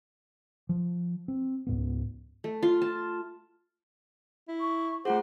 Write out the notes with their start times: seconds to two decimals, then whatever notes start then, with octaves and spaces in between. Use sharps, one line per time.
0.69 F3
1.28 C4
1.67 C#2 G#2 B3
2.44 A3
2.63 F4
2.82 A5
4.48 E4
4.60 C#6
5.05 A3 F4 G#4 C5 F#5